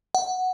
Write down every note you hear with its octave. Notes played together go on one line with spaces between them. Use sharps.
F#5